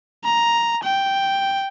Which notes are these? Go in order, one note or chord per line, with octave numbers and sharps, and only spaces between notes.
A#5
G5